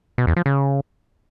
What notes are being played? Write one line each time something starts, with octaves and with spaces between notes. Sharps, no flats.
B2
E2
F3
C#3